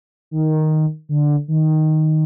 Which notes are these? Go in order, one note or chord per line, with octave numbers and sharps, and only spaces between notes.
D#3
D3
D#3